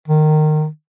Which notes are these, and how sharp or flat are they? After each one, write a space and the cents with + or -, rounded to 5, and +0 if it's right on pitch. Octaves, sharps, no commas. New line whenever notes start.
D#3 -20